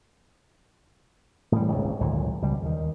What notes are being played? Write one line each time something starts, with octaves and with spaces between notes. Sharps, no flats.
A2 E3 G3
D#1 G#1 C#2 C#3
G#1 D2 A#2 F#3
C#2 B2 G3
D#2 D#3